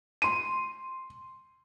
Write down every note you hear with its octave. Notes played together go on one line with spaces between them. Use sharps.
C6 D#7